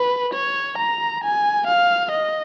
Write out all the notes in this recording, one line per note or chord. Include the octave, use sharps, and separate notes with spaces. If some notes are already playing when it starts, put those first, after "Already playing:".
Already playing: B4
C#5
A#5
G#5
F5
D#5